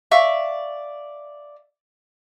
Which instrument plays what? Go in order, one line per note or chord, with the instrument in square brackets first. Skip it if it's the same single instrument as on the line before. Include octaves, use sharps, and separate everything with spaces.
[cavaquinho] D5 E5 F5 C#6